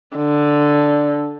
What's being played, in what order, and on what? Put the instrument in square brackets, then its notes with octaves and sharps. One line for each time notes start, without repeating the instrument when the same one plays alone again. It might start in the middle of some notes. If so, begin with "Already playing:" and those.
[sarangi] D3